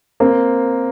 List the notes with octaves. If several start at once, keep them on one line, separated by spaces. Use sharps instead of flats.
A#3 C4